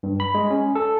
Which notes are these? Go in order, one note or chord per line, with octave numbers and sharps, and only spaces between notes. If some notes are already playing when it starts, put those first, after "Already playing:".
G2
B5
G#3
C#4
A4